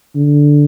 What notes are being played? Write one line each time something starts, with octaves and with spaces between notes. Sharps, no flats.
D3